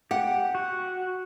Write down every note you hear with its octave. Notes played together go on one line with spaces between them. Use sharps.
G4 F#5
F#4